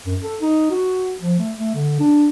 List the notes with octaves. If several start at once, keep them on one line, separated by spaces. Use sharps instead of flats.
F#2
A4
D#4
F#4
F3
A3
A3
D3
D4